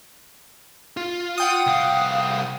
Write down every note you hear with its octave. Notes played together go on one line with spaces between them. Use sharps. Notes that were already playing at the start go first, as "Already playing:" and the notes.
F4
F#5 G5 D#6
C2 F5